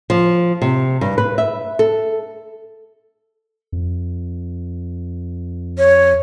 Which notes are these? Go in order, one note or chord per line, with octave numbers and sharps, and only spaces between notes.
F3
C3
G2
B4
E5
A4
F2
C#5